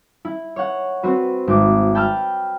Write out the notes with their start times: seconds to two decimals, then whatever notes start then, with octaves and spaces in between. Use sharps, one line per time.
0.25 E4
0.56 C#5 F#5
1.03 C4 F#4 B4
1.47 G#1 D6
1.95 G5 A5 B5 E6 F6